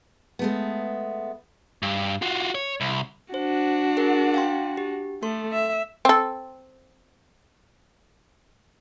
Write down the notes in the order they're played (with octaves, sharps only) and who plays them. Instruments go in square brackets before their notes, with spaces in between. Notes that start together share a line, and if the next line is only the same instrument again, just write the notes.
[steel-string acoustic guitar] G#3 A3 B3
[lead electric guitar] G2
F4 F#4
C#5
C2
[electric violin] D4 F#4 [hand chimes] C5
[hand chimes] G#4 A#4 F#5
F5 G5 C6
G4
[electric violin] A3 [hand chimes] A4 C6
[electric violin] E5
[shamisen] C4 A4